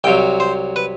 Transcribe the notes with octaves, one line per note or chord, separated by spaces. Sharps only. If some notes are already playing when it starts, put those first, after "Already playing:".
C2 C3 F#3 G5
C5
B4